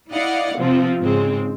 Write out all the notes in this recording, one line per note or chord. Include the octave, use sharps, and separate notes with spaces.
E4 D5 D#5 F5 F#5
C3 F3 C4
G#2 C#3 G#3 C4